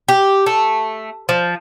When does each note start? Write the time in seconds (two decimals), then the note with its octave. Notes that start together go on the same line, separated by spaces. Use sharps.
0.08 G4
0.46 A3
1.29 F3